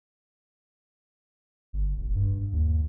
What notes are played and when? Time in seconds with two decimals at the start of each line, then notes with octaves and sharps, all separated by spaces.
1.73 G1
1.96 E1
2.15 G2
2.52 D#2